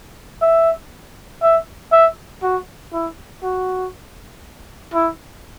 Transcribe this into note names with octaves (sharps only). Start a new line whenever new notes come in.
E5
E5
E5
F#4
E4
F#4
E4